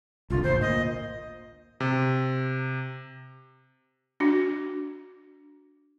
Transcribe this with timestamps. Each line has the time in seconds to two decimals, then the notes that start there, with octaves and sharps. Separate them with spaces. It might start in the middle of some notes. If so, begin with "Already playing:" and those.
0.30 C2 D3 F4
0.44 G#1 D2 C5
0.61 A#2 D#5
1.80 C3
4.20 D4 F#4